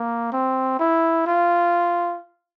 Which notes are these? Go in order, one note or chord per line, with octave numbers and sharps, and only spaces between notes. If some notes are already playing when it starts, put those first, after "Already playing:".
Already playing: A#3
C4
E4
F4